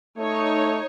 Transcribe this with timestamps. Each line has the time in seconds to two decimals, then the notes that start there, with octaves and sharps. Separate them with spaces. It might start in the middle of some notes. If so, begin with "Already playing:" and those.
0.18 A3 D#4 C#5